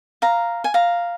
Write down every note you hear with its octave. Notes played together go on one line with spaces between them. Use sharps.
F5 A#5
G#5
F5 A#5